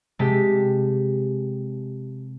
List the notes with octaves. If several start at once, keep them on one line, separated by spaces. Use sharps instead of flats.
C3 G#3 G4 A5 B6